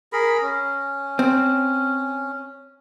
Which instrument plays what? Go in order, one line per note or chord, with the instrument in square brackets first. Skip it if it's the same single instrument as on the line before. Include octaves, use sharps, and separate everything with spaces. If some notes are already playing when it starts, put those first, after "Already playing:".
[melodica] G#4 A#4 B5
C#4
[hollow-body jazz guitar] C4